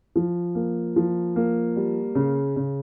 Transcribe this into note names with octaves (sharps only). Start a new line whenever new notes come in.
F3
A#3
F3
A#3
G3
C#3
C#3